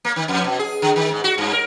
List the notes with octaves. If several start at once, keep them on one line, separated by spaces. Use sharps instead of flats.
A#3
D#3
F2
B2
G#4
D3
D#3
G#2
F#4
G2
A#4